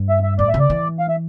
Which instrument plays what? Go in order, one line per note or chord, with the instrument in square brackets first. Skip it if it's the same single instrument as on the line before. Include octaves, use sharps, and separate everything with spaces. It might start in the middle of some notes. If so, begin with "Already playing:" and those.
Already playing: [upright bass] G2
[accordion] E5
E5
[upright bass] A2 [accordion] D5
[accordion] E5
[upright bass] C#3
[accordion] D5
[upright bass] E3
[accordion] F5
E5